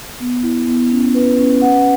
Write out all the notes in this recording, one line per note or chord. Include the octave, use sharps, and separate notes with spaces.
B3
E4
B3
C#4
B4
C#4
F#5